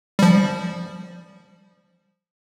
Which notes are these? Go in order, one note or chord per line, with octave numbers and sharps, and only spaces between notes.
F3 G3